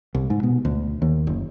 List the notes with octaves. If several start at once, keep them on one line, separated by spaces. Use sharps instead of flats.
C2
G#2
B2
D2
D#2
F#1